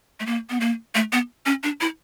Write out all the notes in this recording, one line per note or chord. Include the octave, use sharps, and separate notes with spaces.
A3
A#3
B3
A#3
A3
B3
C#4
D4
E4